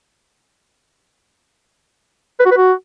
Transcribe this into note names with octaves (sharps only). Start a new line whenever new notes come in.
B4
F#4
B4
F#4